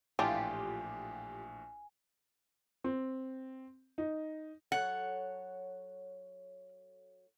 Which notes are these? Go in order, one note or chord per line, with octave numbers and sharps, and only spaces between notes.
A#1 A2 E3 D4 F4 G4 G#5
C4
D#4
F#3 A4 C#5 F#5